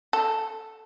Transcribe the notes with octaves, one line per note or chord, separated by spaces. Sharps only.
A4